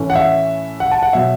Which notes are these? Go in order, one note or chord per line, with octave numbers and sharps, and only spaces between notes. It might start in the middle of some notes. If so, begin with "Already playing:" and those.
Already playing: A2 E3 A3 C#4
F#5
E5
F#5
A5
F#5
B2 F#3 E5